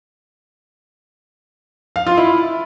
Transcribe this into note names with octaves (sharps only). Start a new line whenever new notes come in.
F5
F4
E4